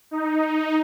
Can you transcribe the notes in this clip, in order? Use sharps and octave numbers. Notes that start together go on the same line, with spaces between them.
D#4